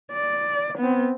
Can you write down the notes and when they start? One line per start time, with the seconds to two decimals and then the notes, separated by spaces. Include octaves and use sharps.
0.12 D5
0.78 B3 C4